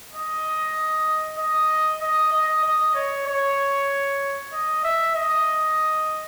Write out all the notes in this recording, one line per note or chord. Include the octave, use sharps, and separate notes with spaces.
D#5
D#5
D#5
D#5
D#5
C#5
C#5
D#5
E5
D#5